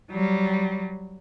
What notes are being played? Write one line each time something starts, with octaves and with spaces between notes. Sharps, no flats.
F#3 G3